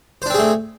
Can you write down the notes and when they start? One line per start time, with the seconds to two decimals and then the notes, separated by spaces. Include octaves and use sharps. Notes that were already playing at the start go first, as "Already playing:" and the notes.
0.22 C5
0.26 D4
0.30 C4
0.34 G#4
0.38 A3